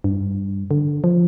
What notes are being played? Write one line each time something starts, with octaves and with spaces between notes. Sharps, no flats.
G2
D3
F3